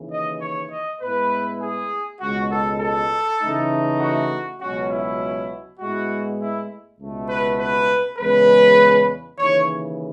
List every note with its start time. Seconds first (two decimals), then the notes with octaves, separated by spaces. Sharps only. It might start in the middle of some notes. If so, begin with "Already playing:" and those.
Already playing: D#2 C#3 E3
0.12 D#5
0.41 C#5
0.71 D#5
1.01 A2 G#3 B3 E4 B4
1.61 G#4
2.21 C#2 B2 G#3 F#4
2.51 A4
2.81 A4
3.41 C#3 E3 A3 D#4
4.00 F#4
4.60 C#2 B2 F#3 C#4 F#4
4.90 E4
5.80 A2 G#3 B3 E4 F#4
6.40 E4
6.99 C#2 B2 A3
7.29 B4
7.59 B4
8.18 E2 C#3 G#3 B4
9.38 D#2 C#3 E3 C#5